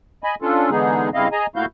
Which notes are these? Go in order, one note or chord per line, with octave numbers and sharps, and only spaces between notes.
D#5 G#5 B5
C#4 D4 F4 A4
D3 E3 G#3 B3 D#4 G#4
G2 C#3 C4 E4 D#5 F5
G#4 D#5 G#5 A#5
A#2 A3 E4 F#4 F5 G6